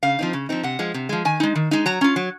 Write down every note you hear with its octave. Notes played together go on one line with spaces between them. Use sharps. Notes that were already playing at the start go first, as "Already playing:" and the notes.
C#3 F5
F3 C4 D#4
C#3
F3 C4 D#4
C3 F#5
F3 G#3
C3
F3 G#3
D#3 G#5
G#3 D#4
D#3
G#3 D#4
F#3 A#5
C#4 F4
F#3